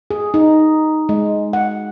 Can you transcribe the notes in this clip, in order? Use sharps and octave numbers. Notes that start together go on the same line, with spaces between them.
G#4
D#4
G#3
F#5